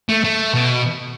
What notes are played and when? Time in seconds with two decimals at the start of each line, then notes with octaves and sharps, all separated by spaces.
0.09 A3
0.24 A3
0.54 B2